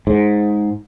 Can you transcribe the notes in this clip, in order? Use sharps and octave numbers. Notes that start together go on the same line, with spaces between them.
G#2